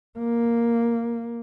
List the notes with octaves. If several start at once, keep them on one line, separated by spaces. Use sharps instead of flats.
A#3